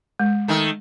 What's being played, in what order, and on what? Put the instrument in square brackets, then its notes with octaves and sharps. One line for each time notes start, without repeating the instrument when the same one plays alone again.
[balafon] G#3
[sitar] D#3 A3